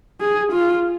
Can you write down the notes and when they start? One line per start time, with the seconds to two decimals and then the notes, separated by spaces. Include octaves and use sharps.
0.21 G#4
0.52 F4